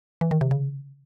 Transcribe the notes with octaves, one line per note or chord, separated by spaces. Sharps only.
E3
D#3
C3
C#3